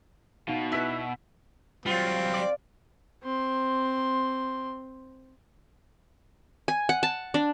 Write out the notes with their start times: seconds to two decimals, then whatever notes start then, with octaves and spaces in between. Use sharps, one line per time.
0.48 B2 D#4 F5
0.72 E4 B4 E6 B6
1.86 F#3 G3 C4 F4
2.34 D5
3.24 C4 C6
6.68 G#5
6.89 F#5
7.03 A5
7.34 D4